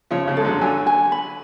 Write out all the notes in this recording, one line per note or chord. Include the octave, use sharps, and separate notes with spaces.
C#3 F3 C#5
C#3 F3
G#3 A4
D3 F#3
D3 F#3 G#5
G#5
B5